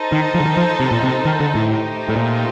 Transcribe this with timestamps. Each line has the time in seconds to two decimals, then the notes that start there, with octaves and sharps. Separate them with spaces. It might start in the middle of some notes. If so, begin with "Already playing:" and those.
Already playing: D#4 A4 C5
0.12 D#3
0.34 F3
0.40 D3
0.46 D#3
0.57 F3
0.80 C3
0.91 A#2
1.03 C3
1.25 D#3
1.40 D3
1.55 A2
1.71 A3 D#4 G4 C5
2.09 A2
2.16 A#2